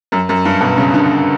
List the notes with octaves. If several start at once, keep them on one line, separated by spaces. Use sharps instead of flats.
F#2
F#2
G2
B2
C#3
D3